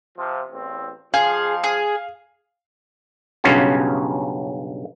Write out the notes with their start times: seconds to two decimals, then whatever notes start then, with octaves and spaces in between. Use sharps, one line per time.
0.18 C3 F3
0.51 A1 E2 C4
1.14 F2 F3 G#4 F5
1.64 G#4
3.44 B1 G2 C#3 C#4 F4 F#4